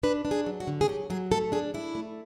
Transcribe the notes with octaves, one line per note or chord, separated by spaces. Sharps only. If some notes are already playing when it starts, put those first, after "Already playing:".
D4 B4
D4
G#4
F#3
F#4
D3
G#4
F#3 G4
F#3 G#4
A3 A4
D4 G#4
D4 E4
A3